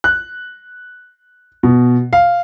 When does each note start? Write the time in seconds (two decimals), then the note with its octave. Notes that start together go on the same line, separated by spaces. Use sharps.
0.04 F#6
1.63 B2
2.13 F5